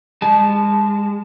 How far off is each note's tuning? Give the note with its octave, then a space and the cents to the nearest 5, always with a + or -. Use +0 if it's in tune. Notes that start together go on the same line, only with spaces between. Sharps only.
G#3 -30 A5 -15